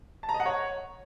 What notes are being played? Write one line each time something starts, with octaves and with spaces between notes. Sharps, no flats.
A5
A#5
D#5
F#5
C#5